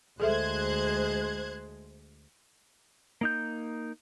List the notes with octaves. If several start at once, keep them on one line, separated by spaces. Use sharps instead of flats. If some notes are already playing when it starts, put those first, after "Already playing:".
D2 G#3 G#4 A4 C5 E5 F#6 G#6
A#3 D#4 G6